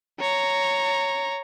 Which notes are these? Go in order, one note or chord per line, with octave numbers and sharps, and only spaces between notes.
C#5 A#5